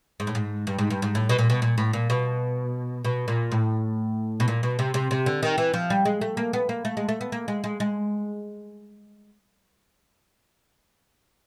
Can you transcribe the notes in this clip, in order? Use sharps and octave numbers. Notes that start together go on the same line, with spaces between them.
G#2
A2
G#2
G2
G#2
G2
G#2
A2
B2
A#2
B2
A#2
A2
A#2
B2
B2
A#2
A2
B2
A#2
B2
C3
C3
C3
D3
D#3
E3
F3
G3
G#3
A3
A#3
B3
A#3
A3
G#3
A3
B3
A#3
G#3
G#3
G#3